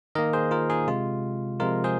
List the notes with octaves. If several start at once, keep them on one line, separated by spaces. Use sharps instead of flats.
D#3 A#3 A#4 D#5
G#4 C5
F4 A#4
D#4 G#4
C3 G#3 F4
C3 F3 G#3 F4 A#4
G#4 C5